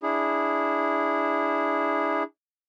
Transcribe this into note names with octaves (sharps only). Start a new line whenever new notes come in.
D4 E4 G#4